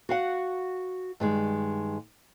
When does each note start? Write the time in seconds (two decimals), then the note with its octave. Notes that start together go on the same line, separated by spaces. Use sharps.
0.09 F#4 F5 F#5
1.20 G2 D#3 G#3